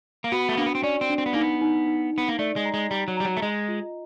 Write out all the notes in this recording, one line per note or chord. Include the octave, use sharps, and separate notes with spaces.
A#3
B3 F#4
A3
A#3 D4
B3
C4
C#4 D5
C4
D4
C4
B3
A#3 D#4
B3
D#4
D#4
B3 D#4
A#3
A3 D5
G#3
A#5
G#3
G3 A#5
F#3
G3 A#5
F#3
A3
G#3 D#5
F4